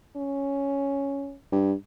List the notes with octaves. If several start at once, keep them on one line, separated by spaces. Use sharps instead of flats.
C#4
G2